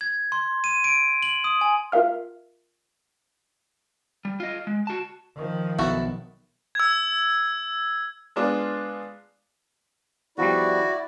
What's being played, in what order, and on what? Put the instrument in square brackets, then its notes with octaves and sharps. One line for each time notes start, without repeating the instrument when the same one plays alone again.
[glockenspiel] G#6
C6
D#7
D7
F#7
D#6
G#5
[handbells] F4 A#4 E5 F5 F6
[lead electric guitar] G3
F4 D#5
G#3
F#4 A5
[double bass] D#3 F3
[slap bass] B1 [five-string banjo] E4 F#4 A4
[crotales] E6 G#6
[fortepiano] G#3 B3 D4 F4
[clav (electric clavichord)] E2 F3 G3 [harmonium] E4 D5 [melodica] F#4